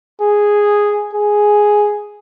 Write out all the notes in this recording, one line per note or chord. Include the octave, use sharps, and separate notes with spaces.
G#4
G#4